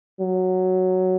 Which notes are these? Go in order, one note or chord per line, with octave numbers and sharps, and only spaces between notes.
F#3